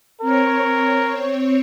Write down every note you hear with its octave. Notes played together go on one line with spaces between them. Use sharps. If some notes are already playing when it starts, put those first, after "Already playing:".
C4 A#4 C#5